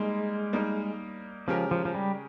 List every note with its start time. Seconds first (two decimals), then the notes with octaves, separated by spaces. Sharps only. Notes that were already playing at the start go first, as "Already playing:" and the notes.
Already playing: G3 G#3 A#3 D#4 A#4
0.53 G3 A#3 D#4 A#4
1.48 C#3 F3 G#3 C#4 G4 A#4
1.71 F3
1.85 F3
1.95 G3